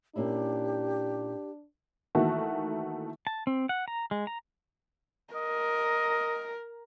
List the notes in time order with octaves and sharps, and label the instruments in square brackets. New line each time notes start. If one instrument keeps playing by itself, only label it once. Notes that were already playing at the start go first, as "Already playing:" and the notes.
[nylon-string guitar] A#2 C#4 E4 [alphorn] D4 [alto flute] G4
[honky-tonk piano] D#3 E3 A3 A#3 F#4
[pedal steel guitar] A5
C4
F#5
A#5
G#3
A#5
[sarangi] A#4 [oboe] D#5